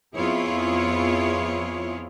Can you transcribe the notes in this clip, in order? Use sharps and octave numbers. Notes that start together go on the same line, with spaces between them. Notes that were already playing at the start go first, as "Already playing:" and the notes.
F2 B3 E4 F4 G#4 C#5